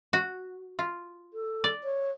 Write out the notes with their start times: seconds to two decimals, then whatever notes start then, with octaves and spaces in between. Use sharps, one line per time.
0.13 F#4
0.79 F4
1.33 A4
1.64 D5
1.84 C#5